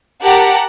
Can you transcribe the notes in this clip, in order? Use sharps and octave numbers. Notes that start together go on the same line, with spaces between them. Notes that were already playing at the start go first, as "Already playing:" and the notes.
G4 A#4 F#5 A5